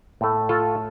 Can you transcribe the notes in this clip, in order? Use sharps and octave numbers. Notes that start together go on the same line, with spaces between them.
A2 A3
F4 A4